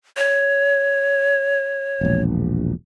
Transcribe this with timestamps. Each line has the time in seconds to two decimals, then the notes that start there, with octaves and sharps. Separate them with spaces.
0.17 C#5
2.01 E1 A#1